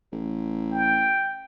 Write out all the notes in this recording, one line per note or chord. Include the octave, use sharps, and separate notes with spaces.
A1
G5